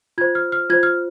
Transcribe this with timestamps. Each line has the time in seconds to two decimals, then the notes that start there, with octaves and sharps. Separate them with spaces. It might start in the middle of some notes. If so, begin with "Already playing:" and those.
0.18 F4 C5 G#6
0.35 F6
0.52 F6
0.70 F4 C5 G#6
0.83 F6